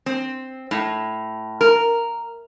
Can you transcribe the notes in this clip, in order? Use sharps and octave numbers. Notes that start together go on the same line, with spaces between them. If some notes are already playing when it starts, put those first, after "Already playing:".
C4
A2
A#4